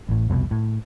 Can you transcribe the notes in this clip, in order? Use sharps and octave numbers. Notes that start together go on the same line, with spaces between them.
A1 A2
F1 C2 B2
A2